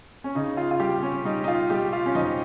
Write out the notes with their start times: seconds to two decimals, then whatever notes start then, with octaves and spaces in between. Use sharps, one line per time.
0.24 C#4
0.35 C#3 D#4
0.57 F4
0.71 F4
0.80 G3 G4
1.03 C#4
1.25 G3 D#4
1.44 D#4
1.48 F4
1.70 G3 G4
1.93 F4
2.06 C#4
2.15 F2 D#4